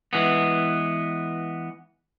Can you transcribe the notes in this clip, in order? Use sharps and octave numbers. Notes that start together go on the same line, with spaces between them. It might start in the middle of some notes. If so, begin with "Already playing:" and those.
E3 G#3 B3